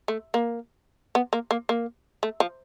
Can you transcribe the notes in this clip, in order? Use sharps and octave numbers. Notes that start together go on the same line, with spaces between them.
A3
A#3
B3
A#3
A#3
A#3
A3
F3